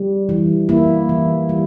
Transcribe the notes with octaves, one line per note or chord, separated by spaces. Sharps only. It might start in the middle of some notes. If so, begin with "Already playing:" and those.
Already playing: G3
E3
A#3 E4
E3
G3